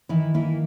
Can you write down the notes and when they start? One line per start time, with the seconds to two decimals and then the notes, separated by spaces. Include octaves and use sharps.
0.09 D#3 E3 E4
0.34 E3 A#3 E4